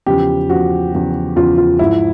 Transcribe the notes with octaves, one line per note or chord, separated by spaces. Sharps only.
E2 C#3 F3 G4
E2 C#3 F3 F#4
E2 C#3 F3
E2 C#3 F3 F4
F4
G#2 F3 E4